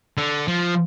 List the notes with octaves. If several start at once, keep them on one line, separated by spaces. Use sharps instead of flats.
D3
F3